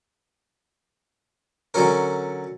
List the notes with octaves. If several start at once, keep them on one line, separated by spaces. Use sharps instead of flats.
D3 F#3 C#4 A#4